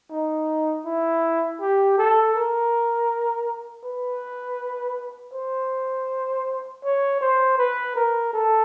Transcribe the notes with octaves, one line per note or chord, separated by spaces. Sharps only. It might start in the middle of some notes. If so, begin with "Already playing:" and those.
D#4
E4
G4
A4
A#4
B4
C5
C#5
C5
B4
A#4
A4